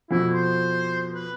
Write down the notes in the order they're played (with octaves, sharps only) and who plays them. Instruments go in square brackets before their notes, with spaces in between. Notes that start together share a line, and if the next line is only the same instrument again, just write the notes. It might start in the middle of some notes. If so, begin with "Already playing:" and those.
[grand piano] F2 B2 [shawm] E4
[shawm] C5
B4